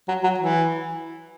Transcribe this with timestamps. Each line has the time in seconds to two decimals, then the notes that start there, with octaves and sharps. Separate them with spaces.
0.08 F#3
0.24 F#3
0.38 E3